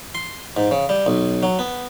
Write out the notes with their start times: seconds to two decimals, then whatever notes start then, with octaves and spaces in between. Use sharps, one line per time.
0.15 C6
0.57 G#2
0.71 C#3
0.89 G3
1.06 B1
1.43 F#3
1.59 B3